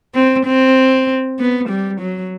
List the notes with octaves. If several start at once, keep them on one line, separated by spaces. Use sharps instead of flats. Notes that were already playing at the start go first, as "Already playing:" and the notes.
C4
C4
B3
G3
F#3